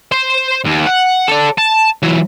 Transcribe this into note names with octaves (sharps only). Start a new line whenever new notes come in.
C5
D#2
F#5
A4 D5
A5
E3 F#3